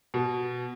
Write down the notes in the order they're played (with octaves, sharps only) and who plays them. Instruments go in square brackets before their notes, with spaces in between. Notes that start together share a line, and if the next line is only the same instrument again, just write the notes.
[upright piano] B2